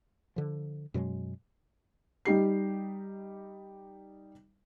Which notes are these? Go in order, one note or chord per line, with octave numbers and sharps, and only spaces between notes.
D3 F3
F#2 B2 F#3 G#3
G3 D#4 G4 C7